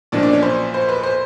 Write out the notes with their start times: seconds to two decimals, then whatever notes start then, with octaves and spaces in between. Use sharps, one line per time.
0.12 B1 A#2 F3 D4 D5
0.23 D4 D5
0.33 C#4 C#5
0.42 C5
0.74 C5
0.88 B4
1.03 C5